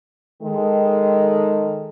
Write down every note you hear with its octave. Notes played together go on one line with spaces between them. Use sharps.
D#3 G#3 A4